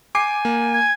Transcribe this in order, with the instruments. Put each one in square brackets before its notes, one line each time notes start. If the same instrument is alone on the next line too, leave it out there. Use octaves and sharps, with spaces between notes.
[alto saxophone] G#5 [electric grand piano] D6 C7
[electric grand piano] A#3
[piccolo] G#6